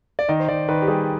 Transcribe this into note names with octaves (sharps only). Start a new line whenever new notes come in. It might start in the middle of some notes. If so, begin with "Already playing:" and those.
D5
D#3 D#5
C5
D#3 D5
D#3 B4
G4
G3 G#4